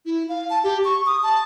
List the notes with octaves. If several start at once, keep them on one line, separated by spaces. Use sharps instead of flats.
E4
F5
A5
G4
C#6
D#6
A5